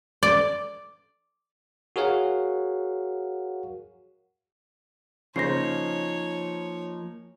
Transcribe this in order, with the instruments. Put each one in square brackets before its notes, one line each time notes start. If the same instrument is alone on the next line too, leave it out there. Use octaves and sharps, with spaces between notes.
[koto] D5
[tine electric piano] F#4 G#4 A#4 C#5 F5 F#5
[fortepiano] C#3 C5 [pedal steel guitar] F3 A#3 D#4 [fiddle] C#5 [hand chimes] A#6 C7